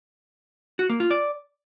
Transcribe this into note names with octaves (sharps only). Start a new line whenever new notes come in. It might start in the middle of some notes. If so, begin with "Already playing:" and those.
F#4
A#3
F4
D5